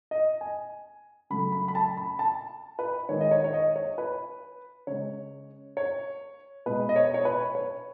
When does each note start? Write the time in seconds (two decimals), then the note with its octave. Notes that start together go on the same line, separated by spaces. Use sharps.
0.11 D#5
0.41 G#5
1.30 C#3 F#3 A3 B5
1.52 B5
1.68 B5
1.75 A5
1.97 B5
2.19 A5
2.79 B4
3.09 D#3 G#3 C#5
3.21 D#5
3.31 C#5
3.44 C#5
3.54 D#5
3.76 C#5
3.98 B4
4.87 C#3 G#3 C#5
5.77 C#5
6.66 B2 G#3 B4
6.89 D#5
6.96 C#5
7.14 C#5
7.25 B4
7.55 C#5